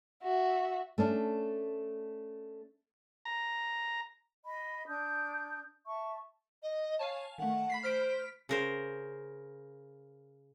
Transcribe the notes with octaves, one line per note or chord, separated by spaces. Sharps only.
F#4 E5
A3 C#4 D4
A#5
D#5 B5
D4 D#6 G6
E5 A5 C#6
D#5
C#5 F5 G#5 A5
D#3 A3 F#5
B5 B6 C7
C5 F6 B6 D7
C#3 A#4 C5